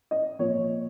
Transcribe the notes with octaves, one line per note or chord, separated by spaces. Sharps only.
D#5
A#2 F3 C#5